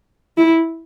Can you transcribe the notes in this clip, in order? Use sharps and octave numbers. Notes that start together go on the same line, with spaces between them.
E4